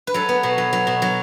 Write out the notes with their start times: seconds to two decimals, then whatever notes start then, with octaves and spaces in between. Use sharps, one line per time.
0.07 B4
0.14 F#3 A4
0.29 B3
0.43 B2
0.58 F#3
0.73 F#3
0.87 B2
1.02 F#3